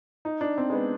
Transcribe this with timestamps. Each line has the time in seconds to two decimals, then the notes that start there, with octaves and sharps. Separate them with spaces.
0.25 D#4
0.41 D4
0.58 C4
0.70 G#3
0.73 B3